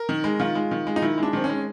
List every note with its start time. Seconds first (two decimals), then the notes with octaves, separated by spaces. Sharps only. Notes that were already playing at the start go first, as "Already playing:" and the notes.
Already playing: A#4
0.09 D#3
0.24 G#3
0.40 D#3 F4
0.55 G#3
0.71 D#3
0.87 G#3
0.96 D#4
1.02 D#3 E4
1.18 G#3 D4
1.33 D#3 C4
1.44 C#4
1.49 G#3